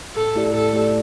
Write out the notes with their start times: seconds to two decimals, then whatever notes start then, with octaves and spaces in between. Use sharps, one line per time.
0.16 A2 A4
0.35 A3 E4 G4 D5
0.54 A2 A4
0.73 A3 E4 G4 D5